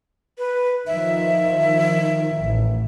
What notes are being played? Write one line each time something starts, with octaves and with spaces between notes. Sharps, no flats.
B4
D#3 F3 E5
A1